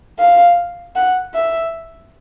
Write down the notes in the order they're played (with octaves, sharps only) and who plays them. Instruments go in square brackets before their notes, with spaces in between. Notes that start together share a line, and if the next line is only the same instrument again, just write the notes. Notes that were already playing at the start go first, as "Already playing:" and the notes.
[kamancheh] F5
F#5
E5